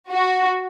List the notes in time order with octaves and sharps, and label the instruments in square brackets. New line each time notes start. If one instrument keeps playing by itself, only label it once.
[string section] F#4